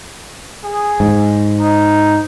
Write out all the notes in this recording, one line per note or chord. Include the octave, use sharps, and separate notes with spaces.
G#4
G#2
D#4